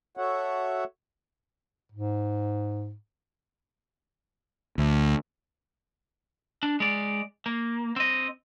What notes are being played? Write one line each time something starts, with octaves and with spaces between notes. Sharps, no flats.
F#4 A4 C#5 E5 F#5
G#2
D2
D4
G#3 D5
A#3
C4 D#5